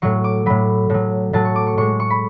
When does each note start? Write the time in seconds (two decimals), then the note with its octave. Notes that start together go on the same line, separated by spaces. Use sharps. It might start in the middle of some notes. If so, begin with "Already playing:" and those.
0.02 A2 F#3 C#6
0.24 D6
0.46 A2 F#3 B5
0.90 A2 F#3
1.33 A2 F#3 A5
1.45 C#6
1.56 D6
1.67 C#6
1.77 A2 G#3 C#6
2.00 C#6
2.10 B5